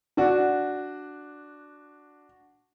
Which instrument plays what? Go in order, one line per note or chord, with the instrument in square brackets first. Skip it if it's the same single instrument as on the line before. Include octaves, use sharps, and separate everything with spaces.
[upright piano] D4 F#4